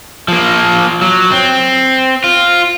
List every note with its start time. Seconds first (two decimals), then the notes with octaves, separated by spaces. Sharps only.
0.28 F3 A#3
1.01 F#3
1.31 C4
2.24 F4